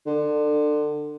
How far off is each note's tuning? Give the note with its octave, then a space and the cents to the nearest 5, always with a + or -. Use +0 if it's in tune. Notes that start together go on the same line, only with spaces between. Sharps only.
D3 +25